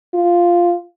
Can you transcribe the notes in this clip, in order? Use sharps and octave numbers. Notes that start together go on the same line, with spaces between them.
F4